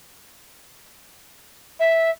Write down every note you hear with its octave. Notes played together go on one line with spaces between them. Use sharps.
E5